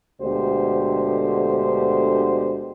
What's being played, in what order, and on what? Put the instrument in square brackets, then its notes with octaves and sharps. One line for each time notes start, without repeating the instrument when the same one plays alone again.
[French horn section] D2 B2 D3 G#3 G4 C5